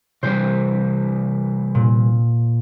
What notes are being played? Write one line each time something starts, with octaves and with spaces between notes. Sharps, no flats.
C3 E3 G3 C5
A#2